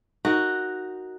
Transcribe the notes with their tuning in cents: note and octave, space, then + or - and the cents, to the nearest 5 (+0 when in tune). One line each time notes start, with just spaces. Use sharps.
D#4 +0 F#4 +0 A#4 +0